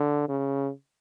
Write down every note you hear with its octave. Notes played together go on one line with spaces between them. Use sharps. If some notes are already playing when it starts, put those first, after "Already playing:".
Already playing: D3
C#3